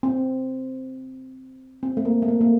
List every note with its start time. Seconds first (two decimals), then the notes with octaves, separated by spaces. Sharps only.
0.03 C4
1.83 C4
1.97 A3
2.05 A#3
2.22 A3
2.28 A#3
2.41 A#3